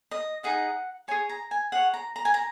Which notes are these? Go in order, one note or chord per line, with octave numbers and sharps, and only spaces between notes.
D#5
D#4 G#4 D#5 F#5
G#4 C#5 G#5
A#5
G#5
G#4 C#5 F#5
A#5
A#5
G#5
A#5